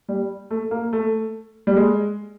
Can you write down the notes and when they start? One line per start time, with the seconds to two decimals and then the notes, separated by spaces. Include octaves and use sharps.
0.09 G3
0.51 A3
0.71 A#3
0.93 A3
1.67 G3
1.76 G#3